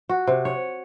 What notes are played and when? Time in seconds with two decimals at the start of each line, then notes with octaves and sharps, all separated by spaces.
0.09 F#4
0.27 C3
0.45 C#5